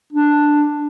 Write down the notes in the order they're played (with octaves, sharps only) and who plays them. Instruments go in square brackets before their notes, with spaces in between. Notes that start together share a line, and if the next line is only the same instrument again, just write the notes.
[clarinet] D4